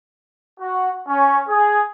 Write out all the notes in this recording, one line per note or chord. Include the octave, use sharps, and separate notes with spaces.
F#4
C#4
G#4